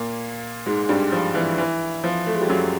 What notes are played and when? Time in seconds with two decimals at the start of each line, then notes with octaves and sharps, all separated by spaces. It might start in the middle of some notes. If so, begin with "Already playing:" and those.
Already playing: A#2 A#3
0.66 G#2 G#3
0.89 G2 G3
1.12 F3
1.35 E3
1.58 E3
2.04 F3
2.27 A3
2.34 G#3
2.42 G3
2.49 F#2 F#3